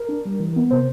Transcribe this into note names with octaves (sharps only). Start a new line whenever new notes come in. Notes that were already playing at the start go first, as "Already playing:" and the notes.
Already playing: A#4
D4
G3
E3
B3
C3 C5